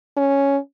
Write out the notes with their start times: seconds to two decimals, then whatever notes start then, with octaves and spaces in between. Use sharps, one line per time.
0.17 C#4